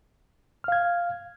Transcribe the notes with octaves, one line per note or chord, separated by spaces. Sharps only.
F5 F6 G#6